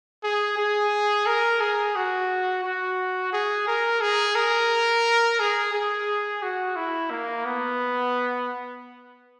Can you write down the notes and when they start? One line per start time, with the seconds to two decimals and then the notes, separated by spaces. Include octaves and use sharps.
0.23 G#4
0.57 G#4
1.26 A#4
1.60 G#4
1.96 F#4
2.64 F#4
3.33 G#4
3.68 A#4
4.01 G#4
4.35 A#4
5.39 G#4
5.73 G#4
6.42 F#4
6.76 E4
7.10 A#3
7.45 B3